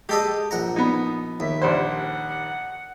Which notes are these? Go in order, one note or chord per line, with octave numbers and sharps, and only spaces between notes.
G#3 G4 A4 D#5
A#1 F#5 A#5
B3 D#4
D#2 E5
A#1 G3 C5 F#5